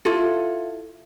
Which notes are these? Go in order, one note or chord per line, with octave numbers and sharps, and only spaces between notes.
E4 F4 A4